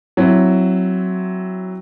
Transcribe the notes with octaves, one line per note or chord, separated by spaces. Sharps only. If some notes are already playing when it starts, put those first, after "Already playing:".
F#3 C4 E4